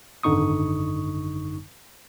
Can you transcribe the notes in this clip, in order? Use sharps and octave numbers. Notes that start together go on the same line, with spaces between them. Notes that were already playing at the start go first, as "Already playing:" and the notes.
G#1 F#2 D3 D#4 C#6 D#6